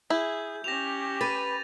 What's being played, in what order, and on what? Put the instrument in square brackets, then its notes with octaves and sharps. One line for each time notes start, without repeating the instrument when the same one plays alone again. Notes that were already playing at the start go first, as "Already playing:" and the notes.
[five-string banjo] E4 [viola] G#4 [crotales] G6
[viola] C#4 G4 [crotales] A#6 E7 F7
[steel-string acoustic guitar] B4 [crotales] A6 D#7